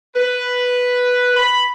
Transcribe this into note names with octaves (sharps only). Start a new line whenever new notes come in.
B4
B5